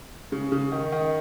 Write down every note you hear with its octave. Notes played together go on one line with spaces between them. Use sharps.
C#3
C#3
D#3
D#3